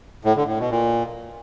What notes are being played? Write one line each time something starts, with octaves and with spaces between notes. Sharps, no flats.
A2
D3
A2
B2
A#2